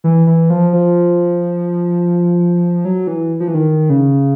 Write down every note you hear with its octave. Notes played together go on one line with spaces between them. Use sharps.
E3
E3
F3
F3
F#3
E3
F3
E3
D#3
C#3